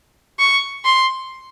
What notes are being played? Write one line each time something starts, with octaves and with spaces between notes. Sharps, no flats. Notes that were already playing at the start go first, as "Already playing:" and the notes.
C#6
C6